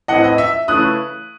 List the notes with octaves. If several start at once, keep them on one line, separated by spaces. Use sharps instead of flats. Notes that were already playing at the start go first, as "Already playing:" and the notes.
A2 E3 C4 E4 D#5 F#5
D#5
E5
C#3 E3 A3 C#4 E4 D#6 F#6